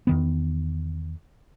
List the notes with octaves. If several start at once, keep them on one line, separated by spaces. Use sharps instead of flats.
E2 D#3 B3